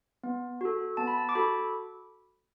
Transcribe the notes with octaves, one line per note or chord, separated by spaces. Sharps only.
B3
F#4 A4
B3 A5
B5
A5
D6
F#4 A4 B5